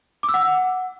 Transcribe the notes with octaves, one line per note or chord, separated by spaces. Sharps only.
D6
E6
F#5